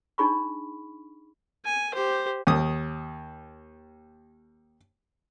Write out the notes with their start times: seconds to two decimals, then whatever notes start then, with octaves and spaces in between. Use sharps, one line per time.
0.18 D4 D#4 G#4 B5 C#6
1.65 G#5
1.94 G4 C5
2.47 D#2 D#6